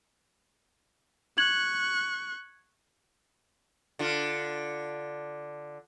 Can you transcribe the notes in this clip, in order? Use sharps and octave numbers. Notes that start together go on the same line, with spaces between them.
C#6 F#6 G#6 F#7
D3 F4